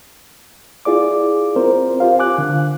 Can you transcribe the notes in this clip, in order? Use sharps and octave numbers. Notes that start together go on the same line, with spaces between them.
E4 F4 G#4 D5 D6
C4 A#4 C5
F4 G4 C5 F5
G#5 D6 F#6
D3